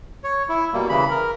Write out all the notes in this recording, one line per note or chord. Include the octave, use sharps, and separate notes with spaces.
C#5
E4
B2 G3 A#3
C#3 E3 B5
A#4